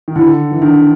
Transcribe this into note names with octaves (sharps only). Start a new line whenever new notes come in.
D#3
D3 E4
E3 D#4
D#3 D4